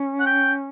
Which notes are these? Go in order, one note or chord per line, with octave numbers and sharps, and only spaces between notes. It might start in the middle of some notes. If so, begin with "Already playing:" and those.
Already playing: C#4
F#5
G5